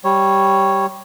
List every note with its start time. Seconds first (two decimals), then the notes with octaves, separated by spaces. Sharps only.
0.04 G3 C#5